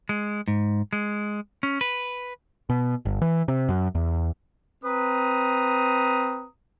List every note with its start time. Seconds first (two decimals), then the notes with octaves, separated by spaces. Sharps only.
0.09 G#3
0.48 G#2
0.93 G#3
1.63 C#4
1.81 B4
2.70 B2
3.05 G1
3.22 E3
3.48 C3
3.69 F#2
3.95 E2
4.84 C4 B4 A#5 D#6